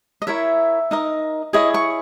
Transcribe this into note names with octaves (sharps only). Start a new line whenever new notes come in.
D#5
E4 A#4 C#5 E5
D#4 A#4 D#5
E4 G#4 C#5 D#5
C#6